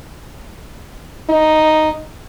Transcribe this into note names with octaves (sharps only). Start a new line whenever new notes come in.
D#4